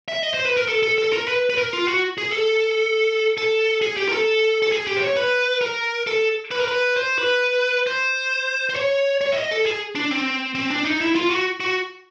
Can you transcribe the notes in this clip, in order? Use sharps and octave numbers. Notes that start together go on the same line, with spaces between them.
E5
D#5
C5
B4
A#4
A4
A4
A4
A#4
B4
B4
A#4
F4
F#4
G#4
A4
A4
G#4
G4
A#4
A4
A4
G#4
G4
C5
C#5
B4
A#4
A4
B4
A#4
B4
C5
B4
C5
C5
C#5
C#5
E5
D#5
A4
G#4
D4
C4
C4
D4
D#4
E4
F4
F#4
F#4